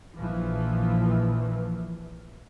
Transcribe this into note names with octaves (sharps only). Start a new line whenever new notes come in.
A#1 A#2 E3 F3